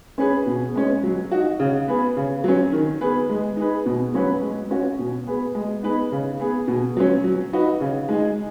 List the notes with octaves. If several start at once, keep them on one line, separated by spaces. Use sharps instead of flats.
C#4 G#4 B4
B2
G#3 C#4
F#3
D#4 F#4
C#3
B3 G#4 B4
C#3
F#3 C#4
D#3
B3 G#4 B4
G#3
D#4 G#4 B4
B2
F#3 C#4 F#4 B4
G#3
C#4 F#4
B2
B3 G#4 B4
G#3
B3 D#4 G#4 B4
C#3
B3 G#4
B2
F#3 C#4
F#3
D#4 F#4 B4
C#3
G#3 D#4 G#4